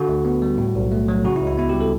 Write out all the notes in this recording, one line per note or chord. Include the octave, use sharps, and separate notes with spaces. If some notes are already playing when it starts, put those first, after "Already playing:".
Already playing: D3 F#4
D2
B3
G3
A2
B1
A3
F#3
C#3 F#4
E4
C#2
E4
B3 E4
G4
G3
A4